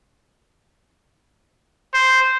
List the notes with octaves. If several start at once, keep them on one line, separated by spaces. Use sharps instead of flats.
C5